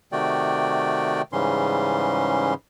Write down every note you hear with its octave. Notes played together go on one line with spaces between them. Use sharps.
C3 D#3 A3 F#4 D5 G5
G#2 C#3 E3 G3 C#4 C6